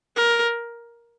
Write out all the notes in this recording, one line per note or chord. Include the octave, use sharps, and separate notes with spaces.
A#4